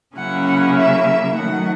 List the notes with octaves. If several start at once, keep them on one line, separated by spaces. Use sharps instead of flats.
C#3 F#3 A#3 C#4 E4 F#5
F#5
E5
E5
D#3 F#3 A3 F#5